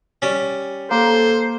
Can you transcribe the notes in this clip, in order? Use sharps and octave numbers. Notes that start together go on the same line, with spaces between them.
G3 C#4
A#3 A4 C5